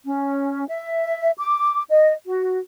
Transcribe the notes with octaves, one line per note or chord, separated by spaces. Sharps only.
C#4
E5
D6
D#5
F#4